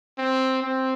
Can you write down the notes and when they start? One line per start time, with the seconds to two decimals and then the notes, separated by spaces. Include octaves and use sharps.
0.18 C4
0.62 C4